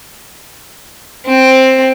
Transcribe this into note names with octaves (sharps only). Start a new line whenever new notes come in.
C4